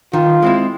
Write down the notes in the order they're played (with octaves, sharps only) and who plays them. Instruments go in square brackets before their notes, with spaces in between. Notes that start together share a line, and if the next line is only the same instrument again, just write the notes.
[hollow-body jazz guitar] D#3 [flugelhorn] F4
[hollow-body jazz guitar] G#3 C4 E4